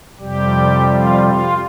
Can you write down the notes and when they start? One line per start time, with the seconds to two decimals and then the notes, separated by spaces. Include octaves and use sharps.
0.19 F2 C3 G3 G4
0.88 F4
1.23 F4